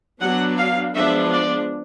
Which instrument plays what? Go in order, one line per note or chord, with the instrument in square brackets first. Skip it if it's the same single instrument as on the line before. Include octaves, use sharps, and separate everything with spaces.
[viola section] F#3 B3 D4 F#5
F5
F3 G#3 B3 D4 E5
D5